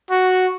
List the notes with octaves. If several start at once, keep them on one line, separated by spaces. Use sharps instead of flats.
F#4